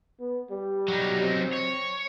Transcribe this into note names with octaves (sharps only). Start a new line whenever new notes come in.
B3
G3
F#3 D#4
C4
C#5